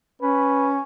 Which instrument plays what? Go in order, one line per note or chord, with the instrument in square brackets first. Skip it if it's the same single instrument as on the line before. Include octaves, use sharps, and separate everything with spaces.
[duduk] C#4 [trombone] B4